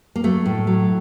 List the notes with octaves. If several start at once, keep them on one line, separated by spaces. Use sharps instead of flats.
A#3
F#3 A3
A2
F#3